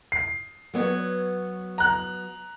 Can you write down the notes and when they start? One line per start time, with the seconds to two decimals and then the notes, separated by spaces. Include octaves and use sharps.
0.12 C7
0.74 F#3 B3 C#5
1.78 A#5 F#6